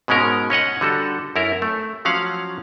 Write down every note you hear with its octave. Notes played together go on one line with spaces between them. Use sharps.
G#2 B2 G#3 C#4 A#4
C#4 C#5 D#5 F#5
D3 G3 F#4 A4
F#2 E4 A4 A#4
A3
F3 F#3 C#4 F5 F#5